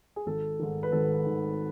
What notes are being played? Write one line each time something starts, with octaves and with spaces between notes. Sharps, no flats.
G#4
G#1 A4
G#2 D#3
B4
G#1 A4
G#2 D#3